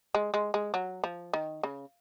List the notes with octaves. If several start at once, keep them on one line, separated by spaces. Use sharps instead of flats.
G#3
G#3
G#3
F#3
F3
D#3
C#3